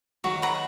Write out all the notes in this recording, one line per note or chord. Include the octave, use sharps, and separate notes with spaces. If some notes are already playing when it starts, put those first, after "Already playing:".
D#3 F#3 F#4
B4 F#5 A#5